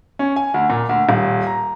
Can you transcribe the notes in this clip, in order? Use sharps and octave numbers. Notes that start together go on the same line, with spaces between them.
C#4
G#5
D2
A#2
D2
D#1
A#5